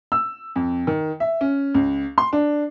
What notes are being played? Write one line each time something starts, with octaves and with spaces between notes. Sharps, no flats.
E6
F2
D#3
E5
C#4
C#2
C6
D4